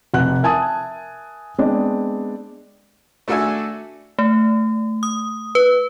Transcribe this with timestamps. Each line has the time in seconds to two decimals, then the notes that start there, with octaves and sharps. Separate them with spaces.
0.14 F1 F#5 F#6
0.43 A#4 E5 G#5 A5 D#6
1.58 G#3 B3 C4 D4
3.28 A3 D4 F#4 A4 E5 G#5
4.19 A3
5.03 D#6
5.55 B4